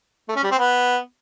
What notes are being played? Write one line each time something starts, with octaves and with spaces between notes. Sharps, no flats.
A3
C#4
G3
C4
B3